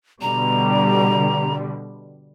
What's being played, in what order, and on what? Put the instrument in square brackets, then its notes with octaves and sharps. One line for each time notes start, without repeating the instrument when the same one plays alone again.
[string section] B2 D3 G3 [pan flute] A#5